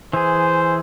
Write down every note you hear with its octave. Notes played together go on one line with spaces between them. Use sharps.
E3 G#4 C5